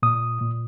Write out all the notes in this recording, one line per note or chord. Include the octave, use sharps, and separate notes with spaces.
A#2 D#6
A#2